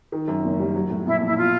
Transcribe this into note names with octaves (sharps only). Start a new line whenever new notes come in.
D#3
F#2
F#1
G3
F#3
A2
A#1 E4
A#1
E4
B2 F4